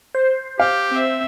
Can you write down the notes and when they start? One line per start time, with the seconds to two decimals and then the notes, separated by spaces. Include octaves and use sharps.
0.15 C5
0.59 G4 F5
0.90 C4 E5